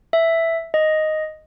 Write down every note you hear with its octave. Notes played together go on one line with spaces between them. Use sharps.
E5
D#5